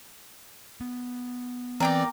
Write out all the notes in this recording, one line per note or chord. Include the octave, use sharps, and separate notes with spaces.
B3
E3 C4 A#4 D5 G5 D6